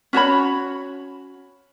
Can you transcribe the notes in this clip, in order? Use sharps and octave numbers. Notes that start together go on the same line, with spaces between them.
C#4 F#4 C#5 B5